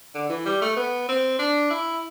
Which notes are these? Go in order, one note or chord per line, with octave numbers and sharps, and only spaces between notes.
D3
E3
G3
A3
B3
C4
D4
E4